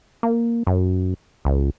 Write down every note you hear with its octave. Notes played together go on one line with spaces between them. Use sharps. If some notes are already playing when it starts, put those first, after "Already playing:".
A#3
F#2
C#2